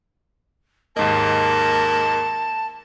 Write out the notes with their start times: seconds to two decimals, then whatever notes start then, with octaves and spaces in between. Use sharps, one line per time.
0.97 D#2 G#2 A#3 D#5 A5